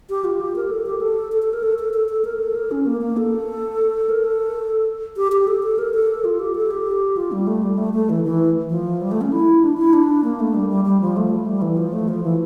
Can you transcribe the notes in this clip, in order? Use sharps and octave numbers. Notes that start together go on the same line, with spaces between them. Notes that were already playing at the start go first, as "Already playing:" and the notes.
G4
F4
G4
A#4
A4
G4
A4
A4
A4
A#4
A4
A4
A4
A4
A#4
A4
A#4
C#4
A#3
A#3
A4
A#4
A4
G4
G4
A4
A4
A#4
A4
F4
G4
A4
G4
F4
G3
A3
G3
A3
A3
E3
E3
F3
G3
A3
C#4
E4
D4
E4
D4
A#3
A3
G3
G3
G3
F3
A3
G3
E3
F3
A3
F3
E3